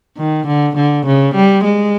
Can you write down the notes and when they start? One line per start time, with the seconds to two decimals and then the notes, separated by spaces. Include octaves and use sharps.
0.18 D#3
0.47 D3
0.76 D3
1.06 C#3
1.35 G3
1.64 G#3